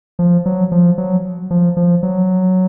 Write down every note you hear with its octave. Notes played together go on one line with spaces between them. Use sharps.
F3
F#3
F3
F#3
F3
F3
F#3